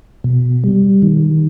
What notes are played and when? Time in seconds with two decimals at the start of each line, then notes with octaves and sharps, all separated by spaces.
0.24 B2
0.64 G3
1.02 D#3